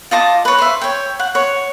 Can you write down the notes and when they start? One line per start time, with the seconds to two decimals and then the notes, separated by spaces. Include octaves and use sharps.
0.11 F4 D#5 A5 D6
0.45 B4 C#5
0.58 C5 E5
0.81 C#5 G5
1.19 F#5
1.35 C#5